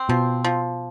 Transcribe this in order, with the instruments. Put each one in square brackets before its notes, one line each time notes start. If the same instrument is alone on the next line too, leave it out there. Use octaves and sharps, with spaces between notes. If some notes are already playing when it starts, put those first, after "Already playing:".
Already playing: [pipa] C4
[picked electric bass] B2 [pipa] F3
[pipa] F3